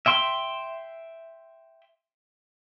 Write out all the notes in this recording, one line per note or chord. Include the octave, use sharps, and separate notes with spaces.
E5 G5 C6